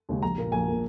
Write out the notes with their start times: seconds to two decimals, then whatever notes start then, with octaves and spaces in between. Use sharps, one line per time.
0.09 D#2 C#3 G#3
0.23 A#1 A#5
0.38 A#2 A#3
0.52 A#1 G#5
0.68 A#2 A#3